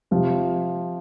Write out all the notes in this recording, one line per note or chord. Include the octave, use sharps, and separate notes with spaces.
C3 F3